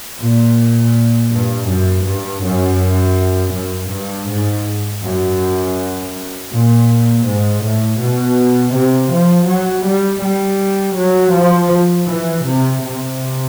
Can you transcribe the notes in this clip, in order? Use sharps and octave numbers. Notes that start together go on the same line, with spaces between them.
A#2
G2
F#2
G2
F#2
F#2
G2
G#2
F#2
A#2
G#2
A2
B2
C3
F3
F#3
G3
G3
F#3
F3
E3
C3
C3